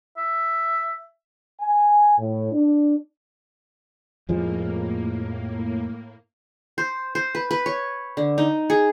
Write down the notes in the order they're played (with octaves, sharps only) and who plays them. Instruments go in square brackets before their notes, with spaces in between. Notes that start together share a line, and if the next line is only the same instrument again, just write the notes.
[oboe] E5
[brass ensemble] G#5
A2
D4
[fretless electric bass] F2 F3 G#3 [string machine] A2 A#3
[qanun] C5
C5
B4
B4
C#5
D3
D#4
G#4